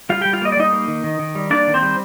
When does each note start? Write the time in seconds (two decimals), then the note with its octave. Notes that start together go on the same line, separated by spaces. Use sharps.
0.09 G3 F4 F5
0.21 G3 G4 G5
0.33 F4 F5
0.42 A#3 D#5
0.52 D5
0.57 G3 D#4 D#5
0.73 A#3
0.88 D#3
1.04 D#3
1.19 D#3
1.35 G3
1.51 A#3 D4 D5
1.67 D#3
1.74 C4 C5
1.82 G3